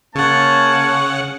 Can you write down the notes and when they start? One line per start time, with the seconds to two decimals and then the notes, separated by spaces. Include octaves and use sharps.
0.15 C#3 A#3 C#4 C#5 F#5 A5